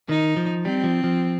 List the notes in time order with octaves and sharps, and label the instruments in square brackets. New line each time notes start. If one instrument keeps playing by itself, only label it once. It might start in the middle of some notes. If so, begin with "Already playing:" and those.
[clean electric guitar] D#3 [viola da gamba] D#4
[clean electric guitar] F3
[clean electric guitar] G3 [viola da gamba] C4
[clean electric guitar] F3
F3